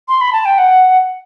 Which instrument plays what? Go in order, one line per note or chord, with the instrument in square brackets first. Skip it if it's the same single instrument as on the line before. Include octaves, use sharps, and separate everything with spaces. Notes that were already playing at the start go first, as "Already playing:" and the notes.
[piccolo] C6
B5
A5
G5
F#5